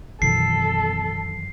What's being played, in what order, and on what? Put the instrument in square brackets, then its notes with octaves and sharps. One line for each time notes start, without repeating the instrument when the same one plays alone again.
[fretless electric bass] F#2 D#3 E3 [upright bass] B2 [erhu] A4 [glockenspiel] C7